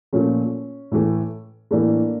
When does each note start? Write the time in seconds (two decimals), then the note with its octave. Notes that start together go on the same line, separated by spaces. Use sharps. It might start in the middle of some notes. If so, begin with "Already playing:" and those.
0.13 A#2 F3 A3 C#4
0.92 A2 E3 A3
1.71 A2 E3 A3 A#3 D4